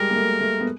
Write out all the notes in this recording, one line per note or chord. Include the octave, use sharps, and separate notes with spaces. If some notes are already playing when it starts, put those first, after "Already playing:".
Already playing: G3 G#3 A#4
A#3
A3
A3
B3